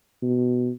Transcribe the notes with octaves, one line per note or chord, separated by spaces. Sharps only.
B2